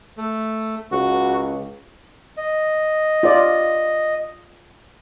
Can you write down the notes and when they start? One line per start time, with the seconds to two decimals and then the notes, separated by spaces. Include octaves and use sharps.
0.18 A3
0.92 C#2 F#4
2.37 D#5
3.23 F4 D5